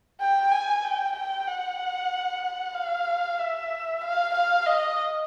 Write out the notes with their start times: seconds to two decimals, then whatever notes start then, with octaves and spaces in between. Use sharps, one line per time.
0.21 G5
0.52 G#5
0.84 G5
1.16 G5
1.47 F#5
2.74 F5
3.39 E5
4.01 F5
4.34 F5
4.66 D#5